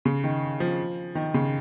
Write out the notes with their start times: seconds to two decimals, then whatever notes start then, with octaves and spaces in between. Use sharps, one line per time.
0.05 C#3
0.24 D#3
0.60 F3
1.15 D#3
1.34 C#3